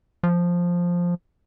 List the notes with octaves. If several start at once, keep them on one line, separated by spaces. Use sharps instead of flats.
F3